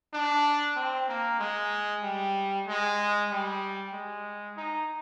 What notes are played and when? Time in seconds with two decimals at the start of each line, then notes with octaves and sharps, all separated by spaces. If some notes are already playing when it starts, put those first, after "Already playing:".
0.14 D4
0.76 C4
1.08 A#3
1.39 G#3
2.03 G3
2.67 G#3
3.31 G3
3.94 G#3
4.57 D#4